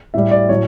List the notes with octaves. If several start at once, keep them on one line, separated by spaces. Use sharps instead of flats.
A2 G3 E5
D5
A2 F#3 C#5